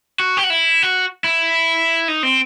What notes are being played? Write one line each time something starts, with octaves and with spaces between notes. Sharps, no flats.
F#4
G4
F#4
E4
F#4
E4
D#4
C4